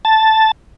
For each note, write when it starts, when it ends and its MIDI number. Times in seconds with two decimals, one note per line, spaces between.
0.05 0.51 81